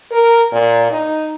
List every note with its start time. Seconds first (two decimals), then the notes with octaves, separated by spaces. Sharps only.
0.12 A#4
0.52 A#2
0.91 D#4